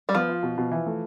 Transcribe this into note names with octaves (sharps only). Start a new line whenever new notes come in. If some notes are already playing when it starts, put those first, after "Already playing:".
G3
F3 B3
F4
B2
B2
E3
A3